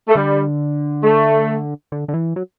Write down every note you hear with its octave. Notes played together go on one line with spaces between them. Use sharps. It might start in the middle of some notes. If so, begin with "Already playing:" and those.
A3
D3 G3
A3
D3
D3
E3
F#3